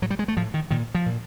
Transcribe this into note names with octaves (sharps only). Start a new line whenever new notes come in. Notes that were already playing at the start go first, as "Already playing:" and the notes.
A2 F#3
G3
G#3
A3
A2 F3
D#3
A#2 D#3
F3
A#2